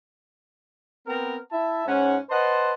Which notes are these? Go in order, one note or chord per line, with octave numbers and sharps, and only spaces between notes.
B3 C4 A#4
E4 E5 A5
G#2 C#4 F#5
B4 C5 D#5 F#5 A5 C6